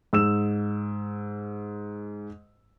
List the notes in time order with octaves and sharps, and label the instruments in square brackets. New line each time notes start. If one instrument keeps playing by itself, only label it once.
[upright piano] G#2 E6 E7